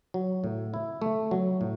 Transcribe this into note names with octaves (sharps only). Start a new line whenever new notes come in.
F#3
A2
E4
A3
F#3
A2